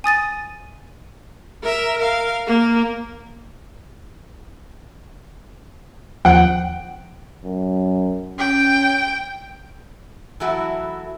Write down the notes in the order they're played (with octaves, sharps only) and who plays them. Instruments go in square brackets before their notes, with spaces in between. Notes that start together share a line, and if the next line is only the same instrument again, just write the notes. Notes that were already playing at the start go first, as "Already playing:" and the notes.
[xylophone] G#5 D#6 A6 D#7
[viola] A#4 E5
A#4 F5
A#3
[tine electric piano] D#2 F3 [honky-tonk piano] F#5 G5
[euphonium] F#2
[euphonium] C#4 [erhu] G5
[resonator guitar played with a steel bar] E3 F#3 A3 E4 F#4